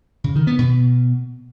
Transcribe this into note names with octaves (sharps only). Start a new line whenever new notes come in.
C#3
D#3
B3
B2